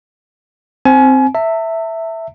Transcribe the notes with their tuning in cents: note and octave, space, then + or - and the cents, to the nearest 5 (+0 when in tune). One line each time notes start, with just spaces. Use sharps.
C4 +0 G#5 +30
E5 +0 A5 +45